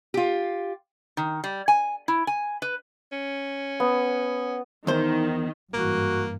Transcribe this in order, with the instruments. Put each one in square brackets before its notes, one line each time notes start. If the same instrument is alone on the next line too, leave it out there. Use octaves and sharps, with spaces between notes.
[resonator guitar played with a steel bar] F4 G4
D#3
G3
G#5
E4
G#5
B4
[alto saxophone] C#4
[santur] B3
[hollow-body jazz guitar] E2 C5 [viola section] D#3
[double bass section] G#1 G2 E3 [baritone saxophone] A#3 [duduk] F#4